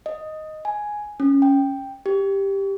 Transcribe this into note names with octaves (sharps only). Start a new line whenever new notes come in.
D#5
G#5
C#4
G5
G4